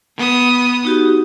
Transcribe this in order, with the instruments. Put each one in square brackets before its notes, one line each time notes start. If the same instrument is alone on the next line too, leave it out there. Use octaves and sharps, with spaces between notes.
[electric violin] B3 D#6
[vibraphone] D#4 F#4 G4